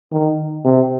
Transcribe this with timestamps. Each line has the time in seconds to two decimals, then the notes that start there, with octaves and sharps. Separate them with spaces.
0.12 D#3
0.65 C3